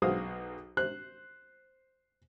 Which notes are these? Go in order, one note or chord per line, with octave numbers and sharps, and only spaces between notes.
B1 F#4 G#4 C5 F5 D#6
C5 F#6